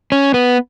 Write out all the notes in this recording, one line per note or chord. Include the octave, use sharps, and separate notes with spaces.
C#4
B3